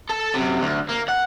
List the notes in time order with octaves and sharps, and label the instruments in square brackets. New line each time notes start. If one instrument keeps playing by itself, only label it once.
[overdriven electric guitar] A4 A5
F#2 C3
D2
A#3
F#5